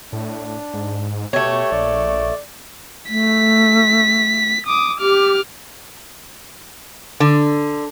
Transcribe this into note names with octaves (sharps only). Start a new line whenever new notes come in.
A2 D4
G#2
B2 A3 G4 C#5
A#1 D5
A3 B6
D6 D#6
G4 D6 F6
D3